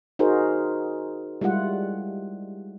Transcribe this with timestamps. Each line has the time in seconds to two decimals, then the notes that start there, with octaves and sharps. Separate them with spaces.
0.19 D#4 F#4 G#4 A#4 C5
1.41 G3 G#3 E4 F4 F#5